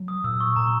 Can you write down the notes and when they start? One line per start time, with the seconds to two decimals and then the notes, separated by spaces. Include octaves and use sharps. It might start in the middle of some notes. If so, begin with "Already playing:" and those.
Already playing: F#3
0.08 D#6
0.24 A#2 E6
0.40 C#6
0.56 A#2 A#5